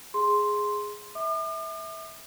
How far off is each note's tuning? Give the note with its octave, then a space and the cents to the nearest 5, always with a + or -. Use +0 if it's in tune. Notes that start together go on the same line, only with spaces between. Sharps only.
G#4 +0 C6 +0
E5 -20 D6 +45